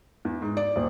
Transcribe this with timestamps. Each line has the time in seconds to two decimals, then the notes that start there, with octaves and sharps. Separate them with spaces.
0.25 E2
0.42 G#2
0.57 D5
0.76 D#1